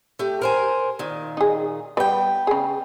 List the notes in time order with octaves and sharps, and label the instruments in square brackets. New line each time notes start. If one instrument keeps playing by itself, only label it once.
[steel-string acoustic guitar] A3 G4
A#4 C5 G#5
A#2 D#3
[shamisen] D#4 G#4
[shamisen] G3 B4 [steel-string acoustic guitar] B3 G5
[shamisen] C#3 G#4